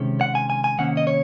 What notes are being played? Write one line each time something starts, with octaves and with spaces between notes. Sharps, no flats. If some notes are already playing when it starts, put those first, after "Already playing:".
Already playing: C3 D#3 G#3 C#4
F#5
G#5
G#5
G#5
C3 D#3 A#3 C#4 F#5
D#5
C#5